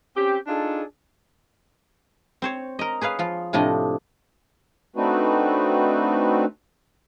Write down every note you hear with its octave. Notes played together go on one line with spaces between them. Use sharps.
C4 C#4 G4
D4 D#4 F4 G#4 A4
C4 C5 C#5
A#4 D#5
G#4 B4 C#5 F5
F3 F4
A2 C3 F3 D4 D#5
A3 C4 D4 D#4 F#4 B4